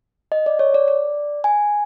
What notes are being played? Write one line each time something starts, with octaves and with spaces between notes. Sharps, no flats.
D#5
D5
C#5
D5
D5
G#5